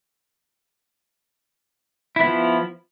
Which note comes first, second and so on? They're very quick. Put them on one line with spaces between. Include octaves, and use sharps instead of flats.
E4 B3 F3